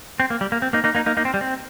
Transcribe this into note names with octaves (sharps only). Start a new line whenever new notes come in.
C4
A#3
G3
A#3
C4
A#3 D#4
A#3 D#4
A#3 D#4
A#3 D#4
A#3 D#4
C4
G3
C4